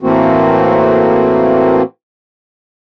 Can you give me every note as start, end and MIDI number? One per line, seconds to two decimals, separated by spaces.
0.01 1.82 45
0.01 1.82 52
0.01 1.82 57
0.01 1.82 58
0.01 1.82 60
0.01 1.82 66